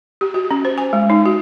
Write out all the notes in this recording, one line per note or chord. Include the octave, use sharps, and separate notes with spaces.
G4
F#4
C#4
C5
G#5
G#3
D#4
F#4